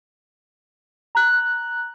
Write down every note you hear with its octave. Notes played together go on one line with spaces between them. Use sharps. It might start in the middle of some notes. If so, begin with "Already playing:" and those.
A#5 F#6